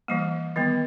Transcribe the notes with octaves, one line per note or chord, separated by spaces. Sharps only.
E3 G3 A#3
D#3 G3 B3